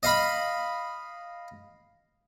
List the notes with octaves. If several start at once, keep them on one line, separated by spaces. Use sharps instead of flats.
D#5 F5 B5